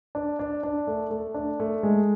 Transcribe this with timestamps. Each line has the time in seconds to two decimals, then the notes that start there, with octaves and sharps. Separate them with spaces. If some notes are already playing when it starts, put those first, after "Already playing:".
0.15 D4
0.39 D4
0.63 D4
0.87 A3
1.10 A3
1.34 D4
1.60 A3
1.83 G#3